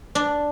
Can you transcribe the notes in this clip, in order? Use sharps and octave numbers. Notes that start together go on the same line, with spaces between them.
D4